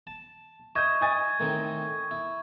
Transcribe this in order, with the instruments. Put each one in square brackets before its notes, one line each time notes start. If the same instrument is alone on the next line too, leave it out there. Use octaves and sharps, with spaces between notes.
[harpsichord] A5
[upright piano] D#5 G6 [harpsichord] E5 [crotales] C#6 G#6
[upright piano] D#5 G#5 A6
[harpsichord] A2 D#3 C4
E4